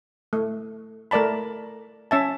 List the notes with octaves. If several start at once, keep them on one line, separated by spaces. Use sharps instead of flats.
A3
A3 A#4 D5 A5 B5
C#4 E5 A5